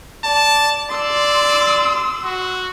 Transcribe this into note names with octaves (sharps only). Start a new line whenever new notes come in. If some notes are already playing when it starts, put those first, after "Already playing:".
D5 A5
D5 C6 E6
F#4